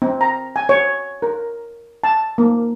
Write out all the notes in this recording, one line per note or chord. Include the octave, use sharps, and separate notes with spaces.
C4
A#5
G#5
C#5
A#4
A5
A#3